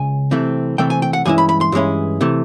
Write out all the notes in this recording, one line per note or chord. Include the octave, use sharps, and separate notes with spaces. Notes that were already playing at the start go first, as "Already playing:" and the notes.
Already playing: C#2 C#3 G#5
C3 E3 A3 C4
C3 E3 A3 C4 G5
G#5
G5
F#5
G2 E3 G#3 C#4 E4 G#5
B5
B5
C6
G2 E3 G#3 C#4 E4
C3 E3 A3